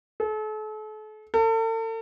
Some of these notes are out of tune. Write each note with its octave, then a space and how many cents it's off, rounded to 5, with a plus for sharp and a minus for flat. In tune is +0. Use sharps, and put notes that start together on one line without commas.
A4 -40
A4 +40